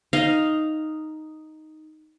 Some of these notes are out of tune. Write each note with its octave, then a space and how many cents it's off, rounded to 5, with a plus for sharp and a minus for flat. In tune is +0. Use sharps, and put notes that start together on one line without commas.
D#4 +0 F5 +0